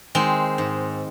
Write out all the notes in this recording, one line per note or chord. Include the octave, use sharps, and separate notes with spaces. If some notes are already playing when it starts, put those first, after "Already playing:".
D#3 G#3 C4
G#2